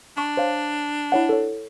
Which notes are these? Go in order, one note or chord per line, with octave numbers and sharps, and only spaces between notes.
D4 A5 C#6
C5 C#5 F5
E4 C#5 F#5
A4 C#5